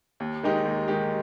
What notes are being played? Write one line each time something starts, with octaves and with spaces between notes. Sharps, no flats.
D#2
D#3 G#3 D#4 G4
D#2
D#3 G#3 D#4 G4